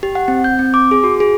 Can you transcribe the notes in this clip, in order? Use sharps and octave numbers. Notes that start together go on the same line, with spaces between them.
G4
F#5
C4
G6
C4
D6
G#4
F#4
G#4